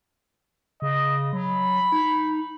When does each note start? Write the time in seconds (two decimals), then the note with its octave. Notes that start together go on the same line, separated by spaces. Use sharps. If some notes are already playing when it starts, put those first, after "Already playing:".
0.82 C#3 D#5
1.33 F#3 B5
1.92 D#4